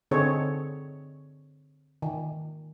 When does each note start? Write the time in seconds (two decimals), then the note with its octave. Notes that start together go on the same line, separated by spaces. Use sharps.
0.11 D3 C4 D#4 G#4 A4 C#5
2.02 D#3